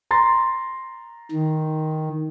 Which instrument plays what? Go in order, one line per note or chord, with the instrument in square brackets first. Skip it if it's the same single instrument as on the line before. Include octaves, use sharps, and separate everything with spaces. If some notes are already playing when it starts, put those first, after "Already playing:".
[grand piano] A#5 C6 A6
[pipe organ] D#3